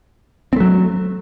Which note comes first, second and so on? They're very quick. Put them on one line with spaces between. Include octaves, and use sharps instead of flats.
C4 A3 F#3